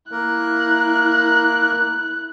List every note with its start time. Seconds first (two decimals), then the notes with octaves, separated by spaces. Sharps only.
0.12 A#3 E4 A#4 F#6